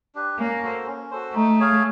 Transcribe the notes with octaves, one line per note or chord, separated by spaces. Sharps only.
D4 G4 B4
A#3 C#4
F#4 A4 C5
C#4
F#4 A4 C5
A3 D#4
G#4 C#5 F5